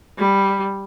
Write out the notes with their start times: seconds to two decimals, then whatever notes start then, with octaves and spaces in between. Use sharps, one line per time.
0.18 G3